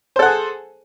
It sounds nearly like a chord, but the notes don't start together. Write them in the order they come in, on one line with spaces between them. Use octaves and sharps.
C5 A4 F#5 G#4